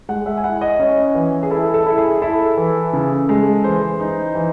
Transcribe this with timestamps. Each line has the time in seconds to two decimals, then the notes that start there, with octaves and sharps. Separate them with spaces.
0.09 G#3 F#5
0.26 E5
0.37 G#5
0.44 E4 F#5
0.61 D#5
0.79 C#4 C#5
1.15 E3
1.43 G#4
1.51 E4 A4
1.74 A4
1.86 E4
1.98 G#4
2.22 E4 A4
2.57 E3
2.93 C#3
3.29 G#3
3.64 E3 C5
4.00 D#4
4.35 E3